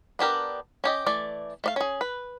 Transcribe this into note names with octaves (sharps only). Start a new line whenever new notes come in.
B3 D4 G4 A#4
C#4 G4 D#5
E3 A3 D5
A3 D5 F5
C#4 G#4
B4